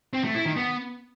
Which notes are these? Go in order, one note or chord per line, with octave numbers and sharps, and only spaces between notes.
C4
A3
E4
D#3
B3